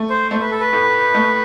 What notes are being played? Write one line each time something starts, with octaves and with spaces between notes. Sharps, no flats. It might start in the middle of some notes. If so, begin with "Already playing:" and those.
Already playing: A3
C5
A3 C5
B4
A4
B4
A2
A3